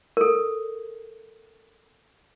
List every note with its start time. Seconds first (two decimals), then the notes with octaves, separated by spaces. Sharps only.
0.17 A4 A#4